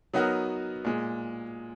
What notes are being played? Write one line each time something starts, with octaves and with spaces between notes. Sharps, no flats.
F#3 B3 D#4 F#4 A#4
A#2 G#3